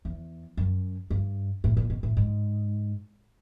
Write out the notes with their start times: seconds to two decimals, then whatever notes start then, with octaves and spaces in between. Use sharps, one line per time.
0.05 E2
0.57 F#2
1.10 G2
1.64 A2
1.77 A#2
1.90 B2
2.03 A2
2.17 G#2